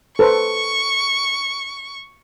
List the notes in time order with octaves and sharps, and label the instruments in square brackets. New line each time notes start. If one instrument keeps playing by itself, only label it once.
[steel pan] A4 B4 C5 [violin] C#6